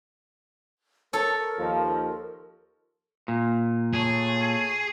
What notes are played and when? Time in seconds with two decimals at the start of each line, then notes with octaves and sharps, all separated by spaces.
1.13 A4 A#4 C#5
1.58 D#2 F3
3.28 A#2
3.93 A3 G#4 C#5 A5